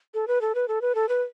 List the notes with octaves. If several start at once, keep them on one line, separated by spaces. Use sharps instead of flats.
A4
B4
A4
B4
A4
B4
A4
B4